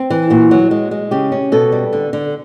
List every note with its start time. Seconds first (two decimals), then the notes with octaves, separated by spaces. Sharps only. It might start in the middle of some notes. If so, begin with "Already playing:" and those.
Already playing: C4
0.10 E3
0.30 A#2 F#4
0.51 F#3
0.71 G#3
0.91 G#3
1.11 C#3 G4
1.32 C#4
1.52 B2 A4
1.72 G3
1.93 D3
2.13 D3